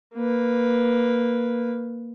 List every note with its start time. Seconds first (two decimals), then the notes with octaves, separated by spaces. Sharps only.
0.15 A#3 B4